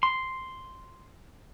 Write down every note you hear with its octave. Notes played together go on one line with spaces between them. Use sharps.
C6